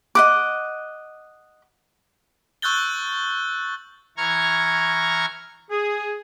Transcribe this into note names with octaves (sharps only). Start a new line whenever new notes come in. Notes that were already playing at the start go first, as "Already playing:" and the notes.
D#5 F#5 D6
C#6 E6 F#6 G6 A6 G7
E3 A#5 C#6 F6 G#6
G#4